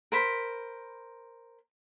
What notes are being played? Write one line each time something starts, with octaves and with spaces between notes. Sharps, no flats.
A#4 C5 B5